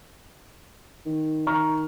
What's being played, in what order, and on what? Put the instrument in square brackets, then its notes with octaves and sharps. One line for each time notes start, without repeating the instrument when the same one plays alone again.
[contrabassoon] D#3
[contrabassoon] D#3 [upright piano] A#5 C#6 F6